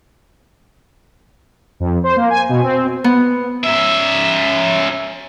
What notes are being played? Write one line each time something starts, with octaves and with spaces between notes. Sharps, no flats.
F2
C5
A#3
G#5
B2
C4
B3
C#4 E5